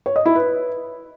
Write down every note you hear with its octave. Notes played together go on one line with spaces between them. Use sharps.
C#5
D#5
E4
B4